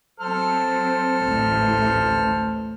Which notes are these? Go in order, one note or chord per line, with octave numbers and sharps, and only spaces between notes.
F#3 C4 A4 C5 F6
A1 D2